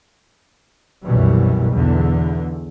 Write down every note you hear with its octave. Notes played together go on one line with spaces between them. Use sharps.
C2 F#2 B2 E3 G3
B1 E2 D3